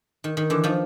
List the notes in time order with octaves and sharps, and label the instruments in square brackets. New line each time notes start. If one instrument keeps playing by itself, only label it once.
[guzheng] D#3
D#3
D3 E3
D#3 F3